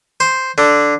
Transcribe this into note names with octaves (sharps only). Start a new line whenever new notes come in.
C5
D3